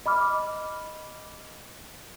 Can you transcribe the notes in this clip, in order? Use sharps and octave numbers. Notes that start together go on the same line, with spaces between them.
D#5 B5 D6 F6